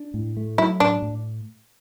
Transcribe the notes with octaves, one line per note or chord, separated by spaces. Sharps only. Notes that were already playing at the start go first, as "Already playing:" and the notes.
Already playing: D4
A2
A3
F#3 E4
A2 D4
A2